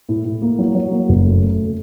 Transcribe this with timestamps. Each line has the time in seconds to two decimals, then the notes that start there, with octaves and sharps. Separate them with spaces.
0.09 A2
0.25 A2
0.42 A#3
0.59 F#3
0.75 F#3
0.92 A#3
1.09 F#1
1.26 A3
1.42 A3